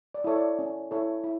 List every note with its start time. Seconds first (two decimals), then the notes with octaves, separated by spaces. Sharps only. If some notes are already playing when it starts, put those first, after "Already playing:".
0.14 D5
0.24 E4 A4 C#5
0.36 D5
0.59 C#4
0.91 E4 A4 C#5
1.24 E4